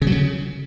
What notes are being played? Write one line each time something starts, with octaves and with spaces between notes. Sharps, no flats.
C#3
F#3
C#3